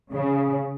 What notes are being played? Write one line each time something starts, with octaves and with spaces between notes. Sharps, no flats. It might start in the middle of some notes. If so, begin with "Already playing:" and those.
C#3